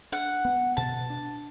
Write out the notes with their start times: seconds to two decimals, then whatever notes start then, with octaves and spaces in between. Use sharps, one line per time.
0.12 D4 F#5
0.45 B3
0.77 B2 A5
1.10 D4